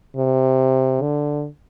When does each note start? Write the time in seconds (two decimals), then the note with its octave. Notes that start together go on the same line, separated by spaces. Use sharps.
0.17 C3
1.02 D3